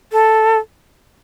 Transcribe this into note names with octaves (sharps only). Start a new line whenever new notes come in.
A4